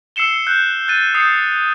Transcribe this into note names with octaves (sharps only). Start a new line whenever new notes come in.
E6 C7 C#7 E7 G7
F#6 G6
F#6 A6 D#7
D#6 G6 C7 C#7